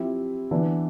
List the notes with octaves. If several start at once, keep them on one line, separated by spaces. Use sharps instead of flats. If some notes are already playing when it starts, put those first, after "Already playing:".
Already playing: F3 C4 E4 G4
E3 B3 D4